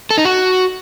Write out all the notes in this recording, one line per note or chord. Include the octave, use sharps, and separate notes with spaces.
A4
D#4
F#4